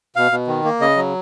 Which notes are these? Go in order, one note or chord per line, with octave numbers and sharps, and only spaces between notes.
B2 F5
B2
D#3
A#3
C#3 D#5
F#3